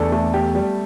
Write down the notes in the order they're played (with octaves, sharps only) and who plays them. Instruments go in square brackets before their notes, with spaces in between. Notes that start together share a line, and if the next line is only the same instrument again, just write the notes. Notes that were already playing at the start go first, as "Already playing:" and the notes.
Already playing: [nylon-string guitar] E2 [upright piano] A3 D4 A4
[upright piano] A3
G4
G3